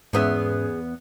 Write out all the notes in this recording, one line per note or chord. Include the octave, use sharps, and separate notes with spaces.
E2 G#2 B3 C#4 G#4 E5